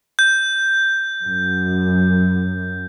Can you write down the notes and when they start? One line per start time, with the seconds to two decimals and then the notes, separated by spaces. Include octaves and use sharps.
0.19 G6
1.24 F#2